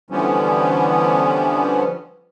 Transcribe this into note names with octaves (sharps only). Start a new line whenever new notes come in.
D3 E3 F3 G3 B3 C#4